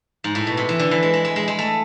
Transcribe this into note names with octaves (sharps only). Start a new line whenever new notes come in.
G#2
A2
B2
C3
E3
D3
E3
G#3
G#3
G#3
G#3
G#3
A3